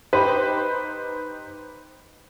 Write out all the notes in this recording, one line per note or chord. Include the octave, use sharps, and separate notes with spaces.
D#4 G4 B4 C5